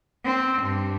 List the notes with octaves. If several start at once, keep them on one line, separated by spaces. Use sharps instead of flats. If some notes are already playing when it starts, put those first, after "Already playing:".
C4
G2